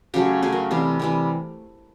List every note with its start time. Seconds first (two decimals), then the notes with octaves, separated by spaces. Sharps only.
0.14 C#3 F#3 A3 G4
0.42 C#3 F#3 A3 G#4
0.52 A#4
0.71 C3 E3 G3
0.99 C3 E3 G3